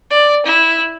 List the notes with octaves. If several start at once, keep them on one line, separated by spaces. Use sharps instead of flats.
D5
E4